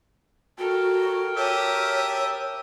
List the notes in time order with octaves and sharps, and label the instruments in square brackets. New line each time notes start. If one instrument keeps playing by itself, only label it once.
[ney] F#4 [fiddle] A4 [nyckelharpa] A#4 G5
[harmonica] G4 E5 [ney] C#5 [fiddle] A5 D#6